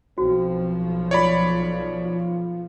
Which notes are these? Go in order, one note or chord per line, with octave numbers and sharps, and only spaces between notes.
B1 F3 C4 F#4
F4 C#5 D5 B5
F4